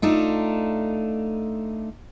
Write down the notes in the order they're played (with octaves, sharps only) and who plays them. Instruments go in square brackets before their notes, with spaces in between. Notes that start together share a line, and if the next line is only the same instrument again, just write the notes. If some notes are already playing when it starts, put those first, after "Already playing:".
[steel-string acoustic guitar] A3 D4 D#4 F4